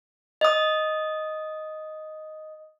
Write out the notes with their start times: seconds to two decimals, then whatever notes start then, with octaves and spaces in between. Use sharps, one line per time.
0.41 D#5 D#6